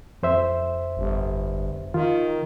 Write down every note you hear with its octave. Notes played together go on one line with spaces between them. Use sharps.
F2 C5 E5
G1
D#3 F4